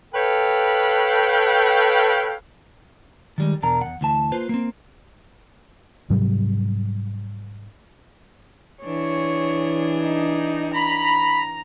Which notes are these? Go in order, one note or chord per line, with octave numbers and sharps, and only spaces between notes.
A4 B4 C#5 F5 G5
D#3 G3 G#3
E2 B2 D4 A#4 A#5
E2 F#5
D2 E3 A5
A#3 F4 B4 C5
A#3 C4
G#2 C3 F#3 G3
E3 D4 G#4 C#5
D#4
A#5 B5